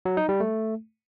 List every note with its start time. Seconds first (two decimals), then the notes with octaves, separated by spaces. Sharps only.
0.05 F#3
0.17 D#4
0.29 G3
0.40 A3